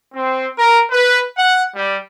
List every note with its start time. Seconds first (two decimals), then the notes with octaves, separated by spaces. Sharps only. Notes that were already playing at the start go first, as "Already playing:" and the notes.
0.15 C4
0.57 A#4
0.91 B4
1.37 F#5
1.76 G3